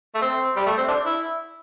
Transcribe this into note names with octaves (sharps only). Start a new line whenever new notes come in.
A3
C4
G3
A3
C4
D4
E4